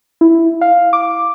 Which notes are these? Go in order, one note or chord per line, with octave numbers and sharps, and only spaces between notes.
E4
F5
D6